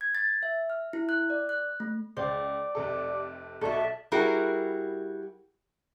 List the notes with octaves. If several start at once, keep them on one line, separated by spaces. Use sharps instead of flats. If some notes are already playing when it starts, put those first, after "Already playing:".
G#6
A6
E5
F6
E4
F#6
D5
F#6
A3
C#2 C5 D5
F1 C3 A4
B1 F#4 A4 D5 E5 A5 C#6
G3 E4 F#4 G#4 A#4